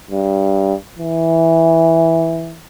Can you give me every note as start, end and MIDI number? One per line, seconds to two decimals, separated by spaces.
0.11 0.74 43
0.98 2.59 52